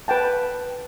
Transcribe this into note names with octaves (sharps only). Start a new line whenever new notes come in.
B4 F#5 G5 A5